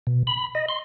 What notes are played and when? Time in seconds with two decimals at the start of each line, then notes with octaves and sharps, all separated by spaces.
0.07 B2
0.27 B5
0.55 D#5
0.69 C6